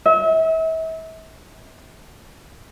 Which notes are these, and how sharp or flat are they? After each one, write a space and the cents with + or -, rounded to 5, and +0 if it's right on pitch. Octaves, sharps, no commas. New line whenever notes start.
E5 -40